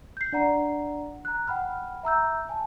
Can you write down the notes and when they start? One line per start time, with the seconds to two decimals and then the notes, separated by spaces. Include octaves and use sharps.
0.17 G6 C7
0.32 D4 D5 F#5 A#5
1.25 A#5 F#6
1.47 F#5 G5 B5 F6
2.03 E5 A#5 E6 G6
2.49 G#5 A5